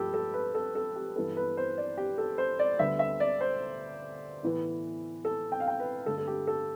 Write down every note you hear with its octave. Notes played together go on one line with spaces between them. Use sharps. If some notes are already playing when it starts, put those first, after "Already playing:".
Already playing: G2 F3 A3 G4 A4
A4
B4
A4
A4
G4
G2 E3 B3 A4
B4
C5
D5
G4
A4
C5
D5
D2 D3 G3 B3 E5
E5
D5
C5
A2 E3 B3
A4
G5
F5
G5
B4
G2 D3 A3 A4
A4
G4
A4